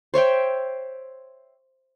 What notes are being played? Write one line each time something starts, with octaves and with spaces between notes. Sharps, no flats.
C5 C#5 E5 G5